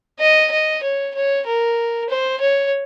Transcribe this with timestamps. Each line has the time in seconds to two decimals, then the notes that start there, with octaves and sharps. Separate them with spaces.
0.19 D#5
0.52 D#5
0.83 C#5
1.15 C#5
1.46 A#4
2.09 C5
2.41 C#5